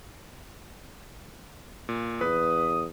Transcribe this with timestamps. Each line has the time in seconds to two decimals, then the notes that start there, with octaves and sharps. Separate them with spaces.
1.89 A#2
2.21 E2 B4 D#6